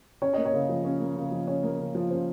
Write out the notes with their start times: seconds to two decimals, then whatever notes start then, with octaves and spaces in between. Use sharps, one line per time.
0.22 C#4 C#5
0.33 A#3 D#5
0.45 C#5
0.53 C#3
0.69 F3
0.85 C#4
1.00 A#3
1.16 C#3
1.32 F3
1.47 C#4 C#5
1.63 A#3
1.79 C#3
1.95 F3
2.11 C#4 C5